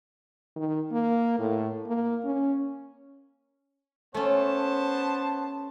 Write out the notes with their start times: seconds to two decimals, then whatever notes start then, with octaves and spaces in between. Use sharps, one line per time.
0.56 D#3
0.91 A#3
1.39 A2
1.87 A#3
2.24 C#4
4.14 A3 B3 C#4 C5 A5